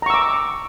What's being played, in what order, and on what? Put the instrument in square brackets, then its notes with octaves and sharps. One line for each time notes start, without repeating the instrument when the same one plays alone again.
[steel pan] A#5
C#6
E6
D6